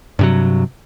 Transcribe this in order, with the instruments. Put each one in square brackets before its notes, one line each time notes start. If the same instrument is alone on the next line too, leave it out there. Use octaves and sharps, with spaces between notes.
[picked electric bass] G2 C3 F#3